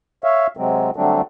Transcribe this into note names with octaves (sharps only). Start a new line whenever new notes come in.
C#5 E5 F5
C3 F#3 G#3 C4
D3 F#3 G3 A3 C4 D4